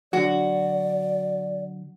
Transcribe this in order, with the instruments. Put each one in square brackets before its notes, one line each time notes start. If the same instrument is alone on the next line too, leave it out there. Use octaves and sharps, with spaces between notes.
[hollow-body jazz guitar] D3 F#3 [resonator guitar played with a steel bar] F#4 [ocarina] D5